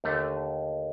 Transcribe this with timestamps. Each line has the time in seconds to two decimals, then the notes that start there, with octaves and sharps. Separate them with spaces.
0.04 D#2 D3 A3